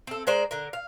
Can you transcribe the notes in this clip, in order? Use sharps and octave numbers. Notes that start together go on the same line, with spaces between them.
C4 A4
G#3 A#4 C5 D5
D3 A#4
F5